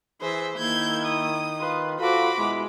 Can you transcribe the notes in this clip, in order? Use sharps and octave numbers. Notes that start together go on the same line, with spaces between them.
E3 G#4 C5 E5
D#3 A#3 E4 G6 G#6
D#6
F4 B4
F4 F#4 A4 C5 B5 D6
B2 G#3 E4